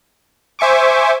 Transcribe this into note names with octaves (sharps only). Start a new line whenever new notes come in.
C5 E5 G#5 C#6 D6